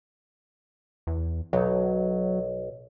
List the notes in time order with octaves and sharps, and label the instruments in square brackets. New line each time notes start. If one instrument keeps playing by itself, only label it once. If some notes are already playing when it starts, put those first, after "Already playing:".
[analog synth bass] E2
[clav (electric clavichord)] B1 [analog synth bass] F#3